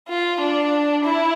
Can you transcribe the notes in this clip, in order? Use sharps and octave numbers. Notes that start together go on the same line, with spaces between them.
F4
D4
E4